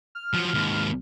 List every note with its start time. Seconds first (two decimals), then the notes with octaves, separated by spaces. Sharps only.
0.15 F6
0.34 F3 F#3
0.54 D#2 G#2